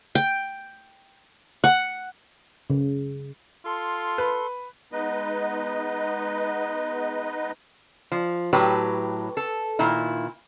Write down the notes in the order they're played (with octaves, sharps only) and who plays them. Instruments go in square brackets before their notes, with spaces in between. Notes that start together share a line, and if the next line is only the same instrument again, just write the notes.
[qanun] G5
F#5
[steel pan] C#3
[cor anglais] F4 [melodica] A4 C6
[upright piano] B4
[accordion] G#3 B3 D#4 B4 D#5
[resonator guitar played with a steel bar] F3
A2 F#3 G4 B4
A4
A#2 D#3 E4